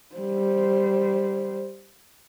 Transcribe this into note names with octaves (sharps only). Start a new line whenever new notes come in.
G3 C5